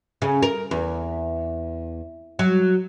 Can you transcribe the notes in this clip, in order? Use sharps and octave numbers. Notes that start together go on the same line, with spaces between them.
C#3
A#4
E2
F#3